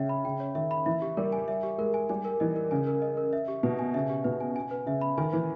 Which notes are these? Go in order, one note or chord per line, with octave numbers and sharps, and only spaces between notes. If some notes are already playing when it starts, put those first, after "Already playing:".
Already playing: C#3 C#5 E5 G5
B5
C#3 G5
C#5
D#3 E5
B5
E3 E5
G4
G3 A#4
G#5
E5
G4
G#3 A#4
G#5
G3 G#5
A#4
E3 D#5
A#4
C#3 G#5
A#4
D#5
A#4
E5
G4
B2 B4
G#5
C#3 E5
G4
B2 B4
G#5
G#5
B4
C#3 E5
B5
D#3 G#5
E3 B4